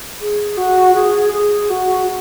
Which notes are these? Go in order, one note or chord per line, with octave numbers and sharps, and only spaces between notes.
G#4
F#4
G#4
G#4
F#4